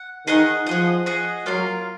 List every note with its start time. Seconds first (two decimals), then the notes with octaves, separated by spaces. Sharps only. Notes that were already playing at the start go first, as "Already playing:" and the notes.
Already playing: F#5
0.27 D#3 G#4 D#5 F#5
0.67 F3 G#4 D#5 F#5
1.06 G#4 D#5 F#5
1.46 F#3 A#3 F4 A#4 F5